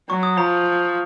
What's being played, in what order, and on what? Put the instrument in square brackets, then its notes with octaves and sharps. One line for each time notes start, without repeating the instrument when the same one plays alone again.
[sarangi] F#3 [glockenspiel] C#6
[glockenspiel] D#6
[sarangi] F3 [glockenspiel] A#5